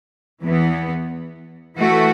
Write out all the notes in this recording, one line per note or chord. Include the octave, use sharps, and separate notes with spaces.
E2 E3 B3
E3 A3 F#4